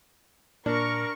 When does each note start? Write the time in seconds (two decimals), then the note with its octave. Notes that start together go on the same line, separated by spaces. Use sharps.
0.66 A#2 D4 A#4 C#6